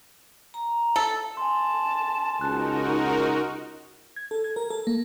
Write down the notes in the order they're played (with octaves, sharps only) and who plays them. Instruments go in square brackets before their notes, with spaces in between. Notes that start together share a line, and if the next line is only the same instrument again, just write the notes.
[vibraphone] A#5
[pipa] A4
[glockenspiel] G#5 C6 [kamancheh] A5
[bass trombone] C#2 [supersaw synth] D#4 F#4 A#4 [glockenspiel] F#6
[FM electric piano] G#6
A4
G#6
A#4
A4
A#3